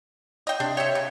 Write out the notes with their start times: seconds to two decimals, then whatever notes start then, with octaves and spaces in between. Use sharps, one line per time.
0.47 D#5 G5
0.60 C3 D4
0.77 C#5 E5 G5
0.95 C#3